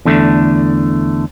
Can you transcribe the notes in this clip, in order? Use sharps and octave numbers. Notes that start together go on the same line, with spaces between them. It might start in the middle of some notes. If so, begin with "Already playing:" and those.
E2 D3 A3